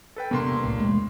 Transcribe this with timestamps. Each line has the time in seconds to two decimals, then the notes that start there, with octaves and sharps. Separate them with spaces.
0.16 A4 B4 G5
0.31 E1 G2 C3 A#3 B3 C6
0.63 G1 C2 A2
0.79 E1 G#3 A3